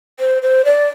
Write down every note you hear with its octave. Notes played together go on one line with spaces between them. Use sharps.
C5
C5
D5